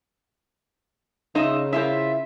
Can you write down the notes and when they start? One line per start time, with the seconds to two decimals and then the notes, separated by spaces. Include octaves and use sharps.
1.35 C#3 D#4 F4 D#5 E5 D#6
1.73 C4 E4 F4 A#4 E5